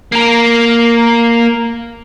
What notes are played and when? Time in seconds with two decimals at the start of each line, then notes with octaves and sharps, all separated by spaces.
0.12 A#3 A#4